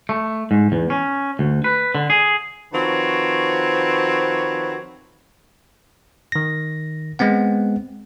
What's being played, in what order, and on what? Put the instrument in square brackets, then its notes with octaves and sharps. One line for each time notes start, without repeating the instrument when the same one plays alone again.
[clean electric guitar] A3
G#2
E2
C#4
D2
B4
D3
G#4
[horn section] D#3 F3 C4 F#4 B4 C#5
[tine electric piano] D#3 A#6
G#3 B3 C4 F#5